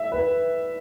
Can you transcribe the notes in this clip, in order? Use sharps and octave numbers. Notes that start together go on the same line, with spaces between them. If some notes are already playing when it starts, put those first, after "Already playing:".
Already playing: E5
B4